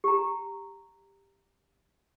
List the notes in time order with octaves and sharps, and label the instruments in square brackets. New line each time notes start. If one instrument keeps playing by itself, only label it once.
[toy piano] G4 A#5